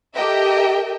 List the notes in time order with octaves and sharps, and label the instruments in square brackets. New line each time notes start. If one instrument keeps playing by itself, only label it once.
[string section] G4 A4 A#4 D#5 E5 G5